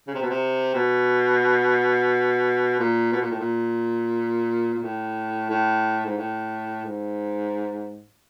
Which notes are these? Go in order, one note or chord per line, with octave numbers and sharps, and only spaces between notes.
C#3
C3
B2
C3
B2
A#2
B2
A#2
A2
A#2
A#2
A2
A2
G#2
A2
G#2